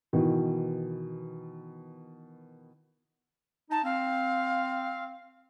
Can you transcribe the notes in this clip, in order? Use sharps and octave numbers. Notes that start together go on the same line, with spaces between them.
B2 D#3 E3
D#4 A5
C4 F5